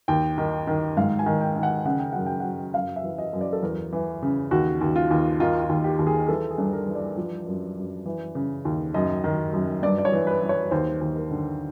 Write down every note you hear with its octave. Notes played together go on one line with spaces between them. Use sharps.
D#2 G5
D#3
D#3
G#2 F5
G#5
D#3
G5
D#3
F#5
C#3 F#5
G5
F#2 F#5
G5
F#2 F#5
F#2 F5
E5
E3
D#5
F#2
D5
A4
E2 A#4
E3
C#3
D#2 F#4
D#2
F4
D#2
D#3 F4
F4
D#2
G4
D#2
G#4
E3 A4
G#4
G2
A#4
E3
D5
F3
F#2
F#2
E3
C#3
D#2
F#2 D#5
D#3
F#2
G2 D5
D5
C#5
E3
B4
E3
C#5
D#2 C5
D#2
A#4
D3